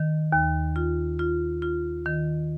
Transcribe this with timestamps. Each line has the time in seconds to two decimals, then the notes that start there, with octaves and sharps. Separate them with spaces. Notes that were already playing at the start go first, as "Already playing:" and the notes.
Already playing: D#3
0.32 D#2
0.76 F4
1.19 F4
1.62 F4
2.05 D#3